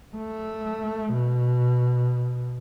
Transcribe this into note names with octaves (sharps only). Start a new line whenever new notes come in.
A3
B2